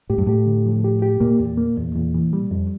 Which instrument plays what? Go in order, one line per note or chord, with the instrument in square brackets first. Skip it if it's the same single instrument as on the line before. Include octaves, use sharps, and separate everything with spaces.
[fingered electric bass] A2 [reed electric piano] G4
[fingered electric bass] G2
[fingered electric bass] A2 [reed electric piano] G4
[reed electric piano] D3
F3
G4
G4
[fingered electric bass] A#2 [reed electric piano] A#3
[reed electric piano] E2
A#3
E2
E2
E3
G3
F2